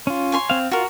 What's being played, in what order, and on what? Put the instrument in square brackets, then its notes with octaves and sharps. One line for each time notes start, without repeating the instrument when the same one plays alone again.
[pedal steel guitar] C#4 F4
[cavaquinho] C#5 G#5 C6
[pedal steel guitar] C4 F5
[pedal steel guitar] F4 [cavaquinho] F#4 A#4